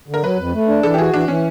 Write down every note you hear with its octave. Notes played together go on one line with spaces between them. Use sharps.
D3
A#4
F#3 B4
F2
A3
D4
E3 A4
G4
F#4 G#4
E3 D4
E3 C#4